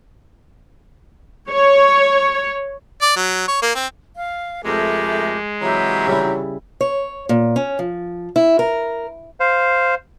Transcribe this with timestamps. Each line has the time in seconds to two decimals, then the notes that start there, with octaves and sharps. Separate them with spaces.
1.51 C#5
3.02 D5
3.16 F#3
3.48 C#5
3.62 A#3
3.75 C4
4.16 F5
4.64 F2 G#3 A3 G4 A#4 D6
5.62 C3 E3 F#3 G4 E5 A#5
6.07 C#3 G3 E4
6.81 C#5
7.29 A#2
7.56 C#4
7.79 F3
8.36 E4
8.59 A#4
9.40 C5 F5